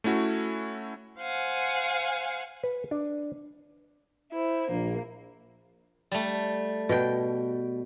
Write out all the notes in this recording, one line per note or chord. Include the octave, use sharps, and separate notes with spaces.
A3 C#4 E4 F#4
C5 F5 F#5 G#5
B4
D4
E4 C5
A#1 A#3
G3 A3
B2 G5